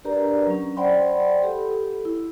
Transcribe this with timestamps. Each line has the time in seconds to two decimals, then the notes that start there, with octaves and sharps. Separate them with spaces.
0.05 D4 G4 A#4 B4 D5 A#5
0.47 F#3 C#4
0.77 C5 D5 F#5 G5 B5 C6
1.42 G4 A4 B5
2.05 E4